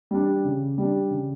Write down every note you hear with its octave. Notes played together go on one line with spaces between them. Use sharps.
G3 D4
C#3
G3 D4
C#3